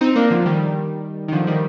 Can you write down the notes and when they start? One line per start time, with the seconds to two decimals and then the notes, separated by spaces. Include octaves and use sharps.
0.01 C4 D#4
0.16 A#3 D4
0.30 D3 F3
0.46 D#3 G3
1.28 D#3
1.32 D3 F3
1.47 D#3 G3